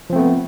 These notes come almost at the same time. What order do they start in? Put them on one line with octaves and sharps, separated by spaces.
F3 C4 A3 B3